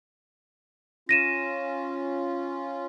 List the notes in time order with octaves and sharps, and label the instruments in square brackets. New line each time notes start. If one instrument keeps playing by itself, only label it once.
[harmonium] C#4 F4 [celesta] A#6 D#7 E7